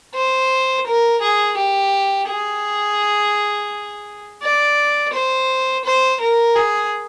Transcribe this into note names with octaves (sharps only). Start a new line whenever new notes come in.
C5
A#4
G#4
G4
G#4
D5
C5
C5
A#4
G#4